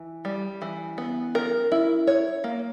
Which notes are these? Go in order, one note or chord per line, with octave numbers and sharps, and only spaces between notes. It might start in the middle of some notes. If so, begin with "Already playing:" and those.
Already playing: E3
G3
E3
B3
A#4
E4
C#5
A#3